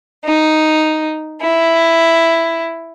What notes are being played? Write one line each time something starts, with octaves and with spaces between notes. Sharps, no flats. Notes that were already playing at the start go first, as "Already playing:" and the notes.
D#4
E4